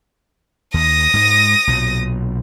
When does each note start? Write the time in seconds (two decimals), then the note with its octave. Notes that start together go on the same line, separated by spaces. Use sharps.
0.74 D#2 D#6 A#6
1.14 G#2 G#3
1.67 B1 A#2 F#3